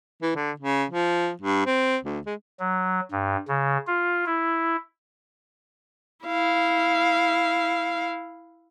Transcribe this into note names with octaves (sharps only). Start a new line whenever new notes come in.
E3
D3
C#3
F3
G2
C4
D2
G#3
F#3
G2
C#3
F4
E4
E4 F5